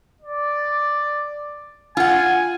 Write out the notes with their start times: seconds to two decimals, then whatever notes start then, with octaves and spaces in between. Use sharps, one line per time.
0.21 D5
1.97 F4 F#5 G#5